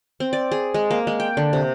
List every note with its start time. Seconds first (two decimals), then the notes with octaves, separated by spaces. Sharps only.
0.20 C4
0.33 D5
0.52 G#4
0.74 G#3
0.91 A#3
1.07 G#3
1.20 G5
1.37 D3
1.53 C3